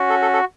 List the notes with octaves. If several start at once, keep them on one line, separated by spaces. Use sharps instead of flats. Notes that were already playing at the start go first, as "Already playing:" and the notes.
Already playing: C#4 F#4
A4
A4
A4